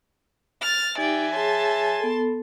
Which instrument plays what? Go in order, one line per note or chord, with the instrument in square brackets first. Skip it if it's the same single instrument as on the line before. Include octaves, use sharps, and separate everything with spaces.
[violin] F6 A6
[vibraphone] D#4 G4 [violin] D5 G5 [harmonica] E5 G#5
[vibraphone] G#4 C#5 [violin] A5 C6
[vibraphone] B3 A4